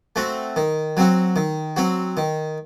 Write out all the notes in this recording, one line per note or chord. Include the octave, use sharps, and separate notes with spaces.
A3 C4 F#4
D#3
F#3 C4 F#4
D#3
F#3 C4 F#4
D#3